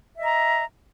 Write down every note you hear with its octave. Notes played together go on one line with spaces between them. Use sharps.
D#5 E5 A#5